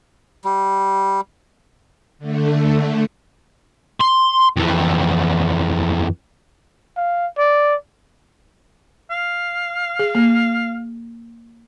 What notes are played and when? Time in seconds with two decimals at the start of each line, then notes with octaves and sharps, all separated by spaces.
0.45 G3
2.19 D3 A3
4.01 C6
4.57 F2 E3
6.97 F5
7.38 D5
9.11 F5
9.99 G#4
10.15 A#3